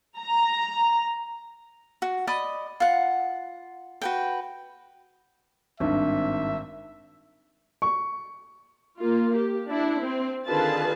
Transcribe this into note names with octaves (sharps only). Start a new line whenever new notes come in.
A#5
F#4
D5 D#5 B5 D#6
F4 F#5
F#4 B4 G5
G#1 G2 C4 D4 D#4 E5
C#6
A#3 F4
G4
D4 E4
C4
D3 D#3 F4 G#4 B4 A5